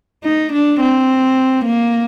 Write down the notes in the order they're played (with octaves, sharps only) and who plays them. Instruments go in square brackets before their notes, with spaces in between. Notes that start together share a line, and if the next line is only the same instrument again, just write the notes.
[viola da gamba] D#4
D4
C4
A#3